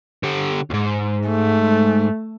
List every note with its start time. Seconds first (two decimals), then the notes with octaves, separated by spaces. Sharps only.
0.23 D3 G4
0.70 D2 G#2
1.27 A3